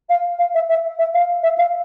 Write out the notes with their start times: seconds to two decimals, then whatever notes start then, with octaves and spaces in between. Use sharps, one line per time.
0.09 F5
0.38 F5
0.54 E5
0.69 E5
0.98 E5
1.13 F5
1.43 E5
1.58 F5